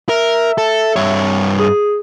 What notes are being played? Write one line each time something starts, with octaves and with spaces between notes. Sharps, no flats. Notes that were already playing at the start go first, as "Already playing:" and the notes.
A#4 E5
A4
G2 C#5
G#4